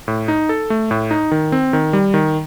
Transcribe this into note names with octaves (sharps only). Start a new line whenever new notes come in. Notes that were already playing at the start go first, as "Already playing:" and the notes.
A2
D#4
A4
A3
A2
D#4
D#3
C4
D#3
G3
D#3